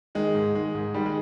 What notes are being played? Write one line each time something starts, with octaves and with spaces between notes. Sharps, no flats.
D#3 G#3
G#2
D#3 G#3
G#2
D#3 G3
G#3